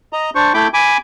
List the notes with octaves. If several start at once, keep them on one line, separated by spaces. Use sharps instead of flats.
D#5 A#5
D4 C5 C#6
A3 E4 G5 B5 D6
G#5 B5 D6